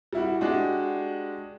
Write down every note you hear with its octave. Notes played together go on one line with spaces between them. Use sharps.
G3 E4 F#4
G#3 D4 F#4 G4